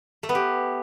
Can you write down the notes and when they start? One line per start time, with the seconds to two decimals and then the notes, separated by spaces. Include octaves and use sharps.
0.23 A3
0.29 B3
0.35 G4